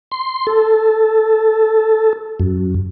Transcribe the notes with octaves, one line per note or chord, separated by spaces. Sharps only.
C6
A4
F#2